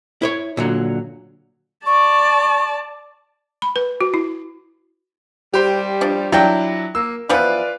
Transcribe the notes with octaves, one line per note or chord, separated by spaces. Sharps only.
E4 C5 C#5
A#2 D3 F#3
D5 A5 C#6
B5
B4
F#4
E4
G3 G4 C5
F3 D4
F#3 D4 E4 F4 G5
A#3 E6
E3 F3 B3 F4 B4 D5